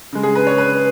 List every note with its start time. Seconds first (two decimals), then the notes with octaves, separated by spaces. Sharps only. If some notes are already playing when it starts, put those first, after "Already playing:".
0.13 C#3 G#3
0.23 G#4
0.35 B4
0.47 C#5
0.58 B4